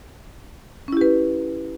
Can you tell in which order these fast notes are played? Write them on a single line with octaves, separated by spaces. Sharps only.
C#4 E4 G4 B4